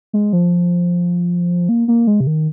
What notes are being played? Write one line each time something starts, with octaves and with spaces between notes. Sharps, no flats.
G#3
F3
A#3
A#3
G#3
C3
D#3